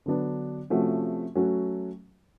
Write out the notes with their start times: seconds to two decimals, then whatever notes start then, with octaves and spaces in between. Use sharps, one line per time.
0.06 D3 F#3 B3 D4
0.70 C3 F3 A3 C#4 F#4
1.35 F#3 A3 C#4 F#4